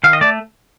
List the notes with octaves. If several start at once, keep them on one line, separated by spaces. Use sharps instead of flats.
D#3 F5
D#5
A3 D5